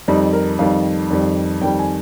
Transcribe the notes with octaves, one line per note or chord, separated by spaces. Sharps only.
F2 D#3 G3 D#4
A#4
F2 D#3 G3 F5
F2 D#3 G3
F2 D#3 G3 G5
G#5